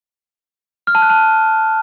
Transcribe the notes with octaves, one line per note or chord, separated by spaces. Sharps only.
F6
A5
F#6
A5